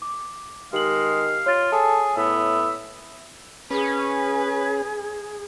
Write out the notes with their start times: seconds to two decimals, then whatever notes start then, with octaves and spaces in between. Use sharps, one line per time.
0.02 D6
0.73 D#3 G#3 G4 F5 F#7
1.46 F4 C#5 A6
1.72 G#4 A4
2.17 A2 B3 E5
3.71 C#4 G#4 B4